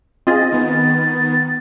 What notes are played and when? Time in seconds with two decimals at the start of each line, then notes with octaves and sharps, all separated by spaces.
0.27 C4 F4 G#4 D#5 A6
0.52 D#3 B3